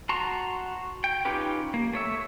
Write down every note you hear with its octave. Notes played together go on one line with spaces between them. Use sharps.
F#4 A5 A#5 C6 C#6
G5
C#4 D#4 F4 G4 B4
A#3
A3 C#5 E5